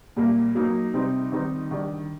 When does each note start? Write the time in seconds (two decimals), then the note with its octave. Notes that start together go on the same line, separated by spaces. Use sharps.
0.16 A#2 G3 A#3
0.55 F#3 A#3 D#4
0.94 C3 G3 C4 D#4
1.32 D#3 G3 C4 D#4
1.71 D#3 G3 D4